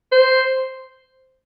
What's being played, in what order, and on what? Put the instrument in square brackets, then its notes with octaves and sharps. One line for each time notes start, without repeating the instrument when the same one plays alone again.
[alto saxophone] C5